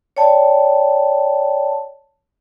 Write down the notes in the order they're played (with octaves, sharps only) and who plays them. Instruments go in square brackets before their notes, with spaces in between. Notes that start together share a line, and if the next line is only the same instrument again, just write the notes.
[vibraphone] C#5 D5 G5 A5